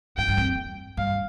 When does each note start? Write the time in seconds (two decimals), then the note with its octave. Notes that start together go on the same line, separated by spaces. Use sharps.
0.17 G#2 G5
0.28 G2
0.37 F2
0.97 G2 F5